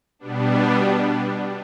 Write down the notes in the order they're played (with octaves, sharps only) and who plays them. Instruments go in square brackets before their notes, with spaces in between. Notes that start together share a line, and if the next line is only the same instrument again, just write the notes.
[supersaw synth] B2 G3 B3 D4